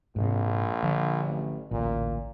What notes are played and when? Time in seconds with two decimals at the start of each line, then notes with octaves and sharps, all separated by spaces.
0.16 A#1 G#2 C3
0.83 D3 F3
1.24 A1
1.71 A1 D2 A#2